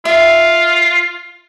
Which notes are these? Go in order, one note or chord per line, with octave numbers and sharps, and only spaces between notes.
F4 E5